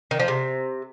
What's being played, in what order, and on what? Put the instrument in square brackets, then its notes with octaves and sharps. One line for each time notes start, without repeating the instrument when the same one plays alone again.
[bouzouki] D#3
F3
C3